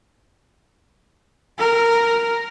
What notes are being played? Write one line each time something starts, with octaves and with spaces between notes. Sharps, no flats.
A#4